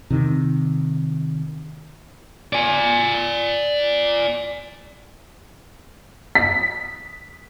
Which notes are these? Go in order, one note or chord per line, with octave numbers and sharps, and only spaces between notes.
C3 D#3
D5 G#5
B6